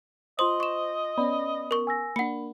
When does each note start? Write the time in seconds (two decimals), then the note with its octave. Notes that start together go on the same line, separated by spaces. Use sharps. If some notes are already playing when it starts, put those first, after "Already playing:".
0.39 F4 C5 D#5 C6 D#6 F#7
0.60 C#6 E7
1.17 B3 C#4 D5 B5
1.71 A#4 C#6
1.87 G#5 E6 A#6
2.16 A#3 D4 F#5 B5 C#7